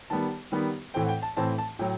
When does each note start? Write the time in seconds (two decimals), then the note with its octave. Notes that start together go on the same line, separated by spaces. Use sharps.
0.10 D#3 G3 B3 A5
0.52 D#3 G3 B3
0.94 A2 E3 A3 C4 G5
1.04 F#5
1.09 G5
1.23 A5
1.37 A2 E3 A3 C4 A5
1.58 A5
1.79 A2 F#3 G5